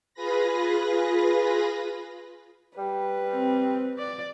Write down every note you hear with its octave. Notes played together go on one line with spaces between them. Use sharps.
F4 G#4 B4 B5 A#6
G3 B4
C4
D5